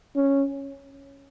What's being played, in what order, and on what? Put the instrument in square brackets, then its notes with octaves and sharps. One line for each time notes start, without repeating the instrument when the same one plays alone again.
[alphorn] C#4